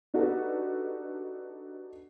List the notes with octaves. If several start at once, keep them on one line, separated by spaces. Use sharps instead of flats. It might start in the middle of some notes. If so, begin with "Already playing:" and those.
D4 D#4 F#4 G4 A4 B4